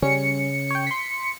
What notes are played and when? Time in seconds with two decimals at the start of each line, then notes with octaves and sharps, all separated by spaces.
0.02 C#3 G3 C#4 C#7
0.71 C#5 G5
0.87 C6 B6